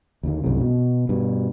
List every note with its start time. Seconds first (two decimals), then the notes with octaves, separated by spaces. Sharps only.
0.23 D#2 D3 D#3
0.44 C2 F#2 A2 C3
0.61 B2
1.09 G2 B2